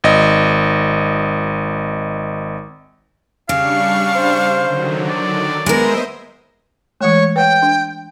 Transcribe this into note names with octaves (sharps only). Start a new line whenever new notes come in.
G#1 D#5
C#3 G3 D4 F5 C#6
C5
D3 D#3 F#3
D5
G#3 B3 A#4 C5 D#5 E5
E3 G#3 A3 C#5
B4 C#5 F#5 G5
D4